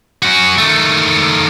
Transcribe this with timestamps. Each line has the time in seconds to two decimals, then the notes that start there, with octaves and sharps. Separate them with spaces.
0.23 C#4 F#4
0.58 D#3 A3